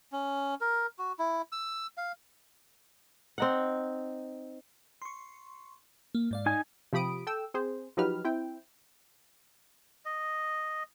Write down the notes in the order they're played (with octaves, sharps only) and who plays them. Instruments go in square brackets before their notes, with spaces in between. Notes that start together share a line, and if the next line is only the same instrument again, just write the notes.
[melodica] C#4
A#4
F#4
E4
E6
F5
[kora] C4 D#4 F#5
[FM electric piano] C6 C#6
A#3
G#2 D5 F5
[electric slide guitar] D#4 G#5
[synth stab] C3 F3 G4 B5 D#6 D7
A4 G5 E6
C4 G#4 C5
F3 F#3 D#4 G4 B4 F6
C4 E4 G5
[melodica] D#5